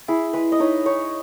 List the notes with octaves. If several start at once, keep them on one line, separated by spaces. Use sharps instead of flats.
E4 G#4
G#3 B4
D#5
D#4 C#5
D#4 C#5